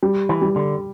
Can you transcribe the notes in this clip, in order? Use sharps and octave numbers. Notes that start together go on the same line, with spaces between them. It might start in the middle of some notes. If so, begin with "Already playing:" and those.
G3
E3
G3
D3